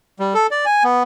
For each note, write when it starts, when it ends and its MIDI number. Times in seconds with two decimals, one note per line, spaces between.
0.20 0.34 55
0.34 0.47 69
0.51 0.65 74
0.65 0.83 80
0.84 1.03 59